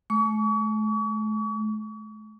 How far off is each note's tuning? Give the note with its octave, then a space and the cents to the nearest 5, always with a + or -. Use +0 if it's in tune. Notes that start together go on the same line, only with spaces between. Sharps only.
A3 -45 C#6 +40